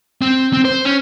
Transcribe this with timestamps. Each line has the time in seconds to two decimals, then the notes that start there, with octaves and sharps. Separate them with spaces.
0.22 C4
0.53 C4
0.65 C5
0.85 C#4